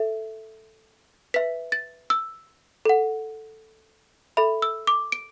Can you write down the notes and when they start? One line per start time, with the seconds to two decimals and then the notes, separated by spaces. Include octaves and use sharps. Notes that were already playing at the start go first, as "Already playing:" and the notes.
Already playing: A4 E5
1.34 B4 E5 B6
1.72 A6
2.10 E6
2.85 A4 F#5
4.37 A4 E5 B5
4.62 E6
4.87 D6
5.12 D7